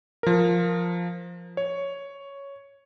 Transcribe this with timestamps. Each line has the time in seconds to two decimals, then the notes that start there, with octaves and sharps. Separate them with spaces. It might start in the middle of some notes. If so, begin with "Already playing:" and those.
0.23 F3 A#4
1.57 C#5